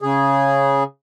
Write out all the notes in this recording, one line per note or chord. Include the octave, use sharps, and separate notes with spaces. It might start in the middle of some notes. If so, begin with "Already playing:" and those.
C#3 G#4